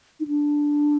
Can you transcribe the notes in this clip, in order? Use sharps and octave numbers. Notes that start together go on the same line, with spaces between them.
D#4
D4